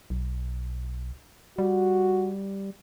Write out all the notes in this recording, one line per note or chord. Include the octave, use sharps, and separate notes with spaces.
B1
G3 F#4